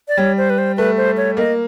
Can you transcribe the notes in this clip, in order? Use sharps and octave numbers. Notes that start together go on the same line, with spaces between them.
D5
G3 C#5
C5
B4
C5
A3 B4
C5
C#5
A#3 D#5